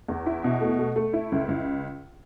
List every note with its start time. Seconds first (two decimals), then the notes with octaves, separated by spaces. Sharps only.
0.08 E2
0.26 E4
0.44 B2
0.61 A3
0.79 A3
0.96 A3
1.13 E4
1.32 C#2
1.48 C#2